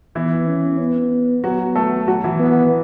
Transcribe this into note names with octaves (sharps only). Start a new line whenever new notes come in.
E3 B3 E4
C#4
B3
F#3 B3 F#4
A3 A4
F#3 F#4
E3 E4
B3